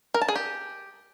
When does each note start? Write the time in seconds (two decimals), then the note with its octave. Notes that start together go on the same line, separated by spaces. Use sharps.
0.14 A#4
0.21 A5
0.28 G#4
0.36 G4